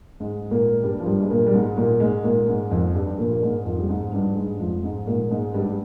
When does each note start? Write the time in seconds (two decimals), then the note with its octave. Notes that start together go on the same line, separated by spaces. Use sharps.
0.20 G#2 G#3
0.51 A#2 A#3
0.83 G2 G3
1.00 F3
1.06 G2 G3
1.21 G#3
1.30 A#2 A#3
1.47 G3
1.54 G#2 G#3
1.77 A#2 A#3
2.00 G#2 G#3
2.24 A#2 A#3
2.48 G#2 G#3
2.71 F2 F3
2.95 G2 G3
3.19 A#2 A#3
3.31 A#3
3.42 G#2 G#3
3.65 F2 F3
3.79 G3
3.89 G#2 G#3
4.13 G2 G3
4.36 G#2 G#3
4.60 F2 F3
4.83 G#2 G#3
5.07 A#2 A#3
5.31 G#2 G#3
5.54 G2 G3
5.69 G3